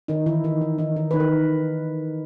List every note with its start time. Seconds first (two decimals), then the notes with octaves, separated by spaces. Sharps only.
0.08 D#3 D#4
0.26 D#3 E3 E4
0.44 D#3 D#4
0.61 D#3
0.78 D#3 D#4
0.96 D#3
1.11 D#3 B4
1.20 A#4